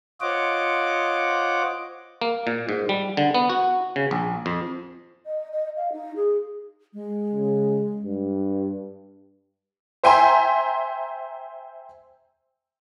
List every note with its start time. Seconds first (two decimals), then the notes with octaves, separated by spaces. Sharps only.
0.21 F4 C5 C#5 D#5 F#5 D6
2.22 A#3
2.47 A#2
2.69 G#2
2.89 G3
3.17 D3
3.34 B3
3.49 F#4
3.96 C#3
4.11 A#1
4.46 F2
5.26 D#5
5.52 D#5
5.77 F5
5.92 D#4
6.16 G#4
6.93 G#3
7.33 C#3
8.04 G2
10.04 C5 E5 G5 G#5 A#5 C6